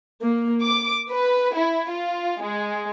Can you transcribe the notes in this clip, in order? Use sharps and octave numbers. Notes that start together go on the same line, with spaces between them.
A#3
D6
B4
E4
F4
G#3